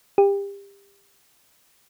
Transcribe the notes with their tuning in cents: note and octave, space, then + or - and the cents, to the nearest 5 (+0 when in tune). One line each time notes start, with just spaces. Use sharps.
G4 +30